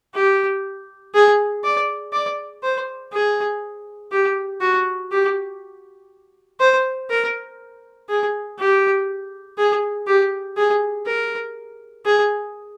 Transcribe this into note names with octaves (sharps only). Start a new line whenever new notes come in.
G4
G#4
D5
D5
C5
G#4
G4
F#4
G4
C5
A#4
G#4
G4
G#4
G4
G#4
A#4
G#4